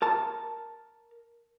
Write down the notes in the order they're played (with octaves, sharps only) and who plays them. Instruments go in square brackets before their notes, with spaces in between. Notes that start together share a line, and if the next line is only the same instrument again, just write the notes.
[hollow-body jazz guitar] A#4 A5